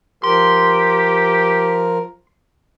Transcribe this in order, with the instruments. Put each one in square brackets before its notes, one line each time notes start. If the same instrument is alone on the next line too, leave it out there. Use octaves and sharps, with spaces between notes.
[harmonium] F3 A#4 [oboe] G4 [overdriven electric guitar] C6